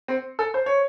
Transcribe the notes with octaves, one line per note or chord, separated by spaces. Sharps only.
C4
A4
C5
C#5